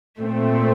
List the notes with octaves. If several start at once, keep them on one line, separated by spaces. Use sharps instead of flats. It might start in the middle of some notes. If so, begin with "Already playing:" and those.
A#2 A3 C4